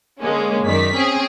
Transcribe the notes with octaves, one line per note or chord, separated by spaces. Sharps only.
D3 G#3 A#3 C#4
F#2 D#3 D5 B6
C4 C#4 G#4